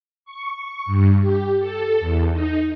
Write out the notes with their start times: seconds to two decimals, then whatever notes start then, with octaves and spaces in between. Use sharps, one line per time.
0.25 C#6
0.86 G2
1.20 G4
1.59 A4
2.00 E2
2.32 D#4